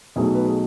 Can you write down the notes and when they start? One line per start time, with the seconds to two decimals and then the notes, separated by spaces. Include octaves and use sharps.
0.16 B1 B2 F#3 A3 G#4
0.35 B4
0.45 G#4